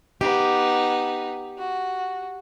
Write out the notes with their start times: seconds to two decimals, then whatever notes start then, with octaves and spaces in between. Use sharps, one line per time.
0.21 B3 D#4 G4
1.58 F#4